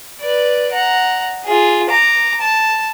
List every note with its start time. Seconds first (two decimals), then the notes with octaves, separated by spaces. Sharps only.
0.20 B4 D5
0.72 F#5 A#5
1.45 F4 G#4
1.90 A#5 D6
2.41 A5